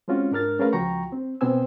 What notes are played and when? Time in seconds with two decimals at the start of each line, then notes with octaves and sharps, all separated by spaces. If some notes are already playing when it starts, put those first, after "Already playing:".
0.08 G#3 C4 C#4 F4 F#4
0.31 G#2 D4 A#4 F6 A6
0.59 A3 C#4 G#4 A#4 B4 F5
0.73 C#2 F3 F#4 G5 A#5 C#6
1.12 C4
1.41 B2 B3 C4 C5 G#5 E6